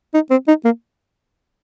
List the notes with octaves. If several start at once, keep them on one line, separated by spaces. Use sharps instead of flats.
D#4
C4
D#4
A#3